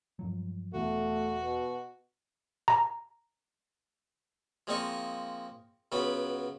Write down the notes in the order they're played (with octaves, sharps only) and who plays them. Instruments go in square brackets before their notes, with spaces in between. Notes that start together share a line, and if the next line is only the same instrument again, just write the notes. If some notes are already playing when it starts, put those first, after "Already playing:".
[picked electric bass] G2 F3 F#3
[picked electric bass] E1 E3 B3 [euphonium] A3 [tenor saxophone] F#4
[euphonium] B2
[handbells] A#5
[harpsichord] F3 G#3 A#3 C4 D#5 C#6
C#2 F#3 B3 B5